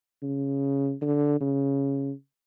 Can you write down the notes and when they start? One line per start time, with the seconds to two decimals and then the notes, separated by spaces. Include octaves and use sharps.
0.23 C#3
1.02 D3
1.41 C#3